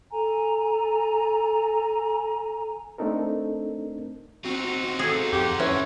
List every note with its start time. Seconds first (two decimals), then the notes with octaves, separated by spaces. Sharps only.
0.11 A4 G#5 A#5
2.98 A3 C4 D4 D#4 A4 A#4
4.45 C4 D#4 F4 F#4
4.99 G#4 A4
5.33 F2 G4 F#5 C6
5.60 E3 C#4